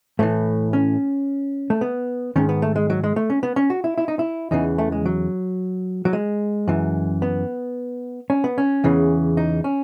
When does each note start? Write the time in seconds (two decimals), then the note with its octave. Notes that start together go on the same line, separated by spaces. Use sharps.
0.19 A2 E3 A3
0.73 C#4
1.70 A3
1.81 B3
2.36 G#2 D#3 C#4
2.49 B3
2.62 A3
2.76 G#3
2.90 F#3
3.04 G#3
3.16 A3
3.30 C#4
3.43 B3
3.56 C#4
3.70 F#4
3.84 E4
3.98 E4
4.08 D#4
4.19 E4
4.51 E2 C#3 E3 D#4
4.78 A3
4.92 G#3
5.06 F#3
6.05 F#3
6.13 G#3
6.68 F#2 E3
7.22 B3
8.30 C#4
8.44 B3
8.58 C#4
8.84 E2 C#3 E3
9.37 D#4
9.64 C#4